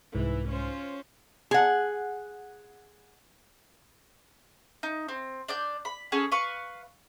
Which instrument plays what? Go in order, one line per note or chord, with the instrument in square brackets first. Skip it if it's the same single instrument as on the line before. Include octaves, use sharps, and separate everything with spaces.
[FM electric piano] C2 G#2 [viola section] E3
[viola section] C#4 F4 C5
[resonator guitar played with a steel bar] G#4 F#5
[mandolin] D#4
C4
D4 D5 G6
B5
C#4 G#4 A4
B4 F5 C#6